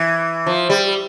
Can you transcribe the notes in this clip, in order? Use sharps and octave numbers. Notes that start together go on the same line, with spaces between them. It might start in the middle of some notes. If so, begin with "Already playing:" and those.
Already playing: E3
F3
G3